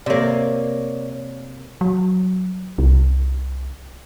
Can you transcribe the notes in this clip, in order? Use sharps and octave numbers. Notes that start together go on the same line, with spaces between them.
C3 A#3 C#5 D5
F#3
C2